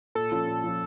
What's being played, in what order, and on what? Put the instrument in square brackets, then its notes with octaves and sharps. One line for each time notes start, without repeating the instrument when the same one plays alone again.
[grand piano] A#2 [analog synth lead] A4
[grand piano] F3 C#4 F4
A#2
F3 C#4 F4